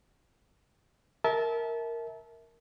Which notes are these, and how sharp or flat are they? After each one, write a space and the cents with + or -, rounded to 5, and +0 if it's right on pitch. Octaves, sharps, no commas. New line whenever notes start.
A#4 -5 E5 -25 A5 -25